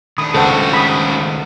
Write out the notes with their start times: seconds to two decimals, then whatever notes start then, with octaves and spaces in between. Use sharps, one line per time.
0.18 D#3 A3 D4 B5 D#6
0.34 C#2 C#3 F#4 A4 C5 F#5
0.73 B5 D#6